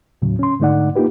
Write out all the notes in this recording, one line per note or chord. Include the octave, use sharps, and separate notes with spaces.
D#2 A2 C#3 F#3
C#4 C6
G#2 D3 A3 D#4 D5 F#5
A#3 D#4 F4 G4 B4